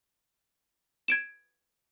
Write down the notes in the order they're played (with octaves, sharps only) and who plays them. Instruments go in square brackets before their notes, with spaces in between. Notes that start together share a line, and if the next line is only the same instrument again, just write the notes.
[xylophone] G#6 D7 E7